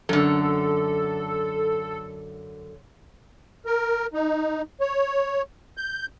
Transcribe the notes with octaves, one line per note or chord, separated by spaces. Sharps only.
F#2 D3 A4
A#4
D#4
C#5
G6